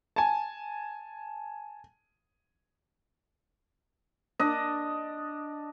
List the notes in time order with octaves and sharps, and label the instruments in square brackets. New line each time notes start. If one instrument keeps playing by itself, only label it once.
[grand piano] G#5 A5
[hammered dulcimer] D4 D#5